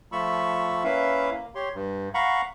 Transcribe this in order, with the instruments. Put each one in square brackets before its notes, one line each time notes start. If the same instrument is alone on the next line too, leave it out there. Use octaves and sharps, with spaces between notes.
[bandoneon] F3 A3 F4 B5 C#6 E6
A#3 C#4 E4 B4 E5 F5
A#3
G4 C#5 C6
G2
F5 F#5 A#5 B5 C#6